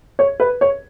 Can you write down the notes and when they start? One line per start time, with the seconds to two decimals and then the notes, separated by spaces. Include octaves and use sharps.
0.19 C#5
0.40 B4
0.61 C#5